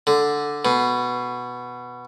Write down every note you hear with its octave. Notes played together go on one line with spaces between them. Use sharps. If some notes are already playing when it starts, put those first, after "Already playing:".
D3
B2